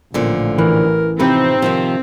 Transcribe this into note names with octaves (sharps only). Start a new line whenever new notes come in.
A1 A#2 D3 F3
E3 A#4
C3 F3 C4 D#4 B4
C3 D#3 F3